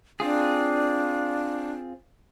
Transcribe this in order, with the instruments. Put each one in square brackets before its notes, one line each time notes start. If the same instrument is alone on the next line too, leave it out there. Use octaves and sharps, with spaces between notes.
[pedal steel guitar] C4 F4 G#4 [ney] D4